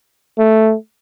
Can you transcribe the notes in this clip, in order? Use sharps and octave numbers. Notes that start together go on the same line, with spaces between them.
A3